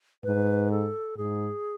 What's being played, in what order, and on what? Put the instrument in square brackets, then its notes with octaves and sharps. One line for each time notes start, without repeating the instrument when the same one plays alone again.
[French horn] G#2 [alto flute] B4
[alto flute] A4
[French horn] G#2 [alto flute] G#4